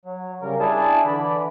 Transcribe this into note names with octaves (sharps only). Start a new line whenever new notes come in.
F#3
C#3 G3 A#4
D4 E4 G#4 G#5 A5
D3 E3 D5 B5